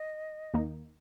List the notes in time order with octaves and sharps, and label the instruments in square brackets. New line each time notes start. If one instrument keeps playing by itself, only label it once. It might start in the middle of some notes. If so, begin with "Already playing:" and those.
Already playing: [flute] D#5
[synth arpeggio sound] D#2 D#3 A#3 D#4